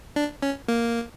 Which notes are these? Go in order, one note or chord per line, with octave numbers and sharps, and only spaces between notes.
D4
C#4
A#3